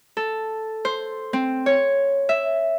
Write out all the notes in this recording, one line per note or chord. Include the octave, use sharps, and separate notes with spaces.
A4
C5
C4
C#5
E5